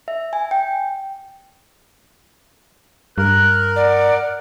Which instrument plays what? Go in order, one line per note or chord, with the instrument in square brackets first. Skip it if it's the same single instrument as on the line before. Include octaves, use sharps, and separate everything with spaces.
[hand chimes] E5
G#5
G5
[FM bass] G2 [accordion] A#4 [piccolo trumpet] F#6
[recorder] D5 [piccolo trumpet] F#5